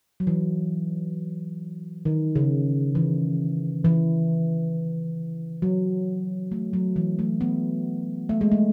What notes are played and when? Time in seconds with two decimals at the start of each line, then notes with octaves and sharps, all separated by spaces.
0.20 F#3
0.27 E3
2.05 D#3
2.36 C#3
2.95 E3
3.85 E3
5.62 F#3
6.52 A3
6.73 F#3
6.96 E3
7.19 A3
7.41 B3
8.29 A3
8.41 G#3
8.52 A3